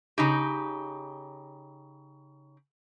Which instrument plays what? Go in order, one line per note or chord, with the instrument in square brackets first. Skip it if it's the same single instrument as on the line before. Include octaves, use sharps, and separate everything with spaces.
[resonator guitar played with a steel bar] C#3 D#4 G4